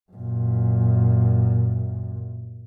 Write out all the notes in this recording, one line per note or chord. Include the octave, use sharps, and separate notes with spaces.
F#2 A#2